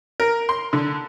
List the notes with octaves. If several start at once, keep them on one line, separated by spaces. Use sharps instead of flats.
A#4
C6
D3